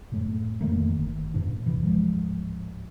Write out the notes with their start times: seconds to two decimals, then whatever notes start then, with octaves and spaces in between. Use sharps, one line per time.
0.12 F#2 A2 A3
0.61 F2 D#3 A3 A#3
0.95 G1 D#3
1.34 E2 G2 A#2 D4
1.66 F1 D#2 C3 E3
1.80 D1 G#2 F3 G#3